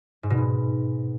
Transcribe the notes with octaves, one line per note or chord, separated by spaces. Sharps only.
G#2
B2
G#2